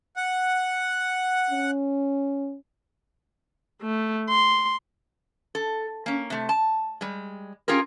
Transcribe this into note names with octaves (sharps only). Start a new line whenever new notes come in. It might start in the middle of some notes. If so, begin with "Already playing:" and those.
F#5
C#4
A3
C6
A4
A#3 C#4
C3 A3
A5
G3 G#3
C#4 F4 G4 G#4 A#4